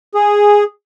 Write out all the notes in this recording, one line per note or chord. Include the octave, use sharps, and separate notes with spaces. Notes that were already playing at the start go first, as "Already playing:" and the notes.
G#4